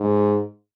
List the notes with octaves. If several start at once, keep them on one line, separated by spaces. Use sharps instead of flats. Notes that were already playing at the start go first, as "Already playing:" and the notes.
Already playing: G#2